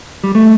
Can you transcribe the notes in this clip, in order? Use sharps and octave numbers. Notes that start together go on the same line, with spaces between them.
G3
A3